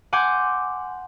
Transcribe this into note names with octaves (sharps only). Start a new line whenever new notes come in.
F#5 G#5 C6 D6 G6